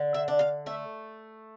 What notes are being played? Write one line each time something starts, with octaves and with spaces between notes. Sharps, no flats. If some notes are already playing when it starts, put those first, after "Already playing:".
Already playing: D3
E5
D4
F5
A3 E5